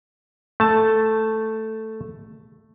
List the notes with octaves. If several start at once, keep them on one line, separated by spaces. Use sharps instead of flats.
A3 A5